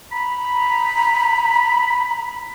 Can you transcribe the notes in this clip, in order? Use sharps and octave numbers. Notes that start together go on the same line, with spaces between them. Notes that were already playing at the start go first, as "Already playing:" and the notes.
A#5 B5